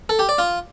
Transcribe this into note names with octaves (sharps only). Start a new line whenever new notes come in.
A4
G4
D5
F4